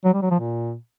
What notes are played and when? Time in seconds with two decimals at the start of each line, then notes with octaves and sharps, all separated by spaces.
0.05 F#3
0.13 G3
0.22 F#3
0.31 F3
0.39 A#2